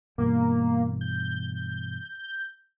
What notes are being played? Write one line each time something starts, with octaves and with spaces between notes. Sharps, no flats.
G2 B2 E3 A#3
G6